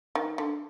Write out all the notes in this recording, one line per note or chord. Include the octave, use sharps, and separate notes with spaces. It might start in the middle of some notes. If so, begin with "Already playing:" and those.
D#3
D3